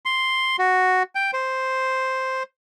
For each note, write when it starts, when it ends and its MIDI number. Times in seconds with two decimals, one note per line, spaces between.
0.05 0.56 84
0.59 1.03 66
1.15 1.31 79
1.33 2.43 72